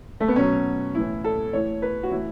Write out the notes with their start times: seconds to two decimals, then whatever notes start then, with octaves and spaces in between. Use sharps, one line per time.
0.20 A3
0.28 B3
0.36 B2 F#3 C#4
0.95 A2 E3 E4
1.24 A4
1.53 A2 E3 C#5
1.82 B4
2.03 F#4
2.11 A2 E3 E4